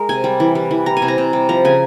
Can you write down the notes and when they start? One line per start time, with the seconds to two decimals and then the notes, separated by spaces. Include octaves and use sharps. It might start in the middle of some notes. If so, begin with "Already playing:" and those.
Already playing: G#3 A#4
0.09 C3 G#5
0.24 G3
0.40 E3
0.55 G3
0.71 E3
0.86 G3 A#5
0.97 G#5
1.02 C3
1.08 A#5
1.18 C3
1.33 G3
1.49 F3 A#5
1.65 C#3 G#5